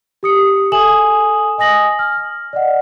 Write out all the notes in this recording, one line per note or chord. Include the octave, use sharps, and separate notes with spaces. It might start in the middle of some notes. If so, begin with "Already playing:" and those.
G4 D#6 C#7
A4 E5 G#5 D#6 E7 F#7
D#5 G#5 D#6 A#6 F#7
F6
D5 D#5 F#5